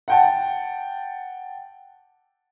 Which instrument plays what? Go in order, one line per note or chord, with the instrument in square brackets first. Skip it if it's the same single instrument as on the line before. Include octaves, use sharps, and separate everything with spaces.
[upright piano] F#5 G5 A5